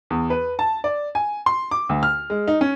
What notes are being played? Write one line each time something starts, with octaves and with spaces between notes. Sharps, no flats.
E2
B4
A5
D5
G#5
C6
D6
D2
F6
G#3
D#4
C#4